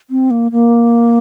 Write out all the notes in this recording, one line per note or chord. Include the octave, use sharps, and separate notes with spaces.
C4
A#3
A#3